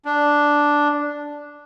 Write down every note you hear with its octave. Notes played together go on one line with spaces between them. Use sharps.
D4